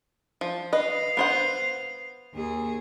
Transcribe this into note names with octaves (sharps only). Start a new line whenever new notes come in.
F3
B4 D#5 F5
B3 C5 F#5
D#2 G#4